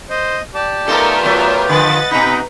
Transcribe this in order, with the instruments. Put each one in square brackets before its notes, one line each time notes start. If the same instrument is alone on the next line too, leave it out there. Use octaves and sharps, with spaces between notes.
[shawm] C5 [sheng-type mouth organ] D#5
[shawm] G4 [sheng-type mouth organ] D5 A5
[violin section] A3 F4 A#4 [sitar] B3 D#4 A4
[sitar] F#3 B3
[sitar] D3 F3 [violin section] B4 A6 [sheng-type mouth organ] D#5 F#5
[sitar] B2 D#4 [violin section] B4 A#5 [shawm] B5